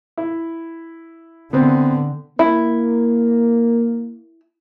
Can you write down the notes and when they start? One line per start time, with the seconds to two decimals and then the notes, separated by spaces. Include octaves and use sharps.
0.17 E4
1.53 D3 B3 C4
2.39 A#3 E4